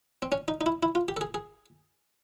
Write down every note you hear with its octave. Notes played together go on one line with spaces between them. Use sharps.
C4
C#4
D#4
D#4
E4
E4
F4
G4
A4
G#4
G#4